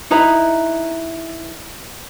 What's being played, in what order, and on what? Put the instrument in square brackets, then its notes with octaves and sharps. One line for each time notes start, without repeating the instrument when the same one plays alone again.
[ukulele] D#4 E4 B4 A#5